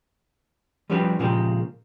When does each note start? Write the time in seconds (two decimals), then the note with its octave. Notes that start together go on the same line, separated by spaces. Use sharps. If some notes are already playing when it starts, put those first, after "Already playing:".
0.90 F3 G3 C#4 F#4 G4 B4
1.19 A#2 C#3 F3 G#3 A#3 G4